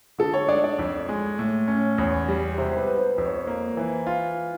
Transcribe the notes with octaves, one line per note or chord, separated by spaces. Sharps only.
D3 A4
C#5
D4 D5
D5
F2
G#3
A2
C#4
E2 C#5
G3
C3 C5
C5
B4
B3
C5
F2 C5
C#5
C5
A#3
E3 C5
F4